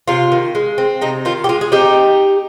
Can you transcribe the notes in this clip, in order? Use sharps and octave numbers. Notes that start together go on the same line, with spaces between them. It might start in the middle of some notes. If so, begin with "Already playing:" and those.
C3 F4
D#3
G#3
C4
C3 D#4
D#3 F4
G4
G#3 F4
G#4
C4 D#4 G4